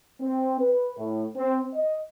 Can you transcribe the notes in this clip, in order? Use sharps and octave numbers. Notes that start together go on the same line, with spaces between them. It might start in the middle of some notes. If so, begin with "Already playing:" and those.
C4
B4
A2
C4
D#5